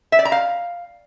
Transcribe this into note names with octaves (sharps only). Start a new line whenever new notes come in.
E5
D5
A#5
F5